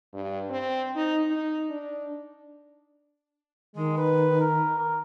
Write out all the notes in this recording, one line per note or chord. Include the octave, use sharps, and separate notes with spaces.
G2
C4
D#4
D#4
D4
D#3 G#3
B4
A#4
A#4